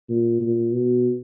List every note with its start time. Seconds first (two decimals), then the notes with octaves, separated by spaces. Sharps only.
0.09 A#2
0.41 A#2
0.74 B2